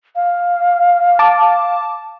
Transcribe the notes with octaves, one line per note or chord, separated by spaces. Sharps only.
F5
A5 D6